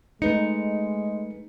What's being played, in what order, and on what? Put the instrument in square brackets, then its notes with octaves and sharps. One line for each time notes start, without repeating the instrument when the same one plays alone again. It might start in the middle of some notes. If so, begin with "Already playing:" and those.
[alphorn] G#3 [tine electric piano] A3 B4 C#7 [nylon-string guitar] D#4